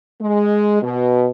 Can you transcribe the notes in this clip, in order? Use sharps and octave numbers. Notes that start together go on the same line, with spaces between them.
G#3
B2